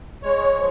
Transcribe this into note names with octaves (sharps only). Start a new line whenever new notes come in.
G#3 C#5
F3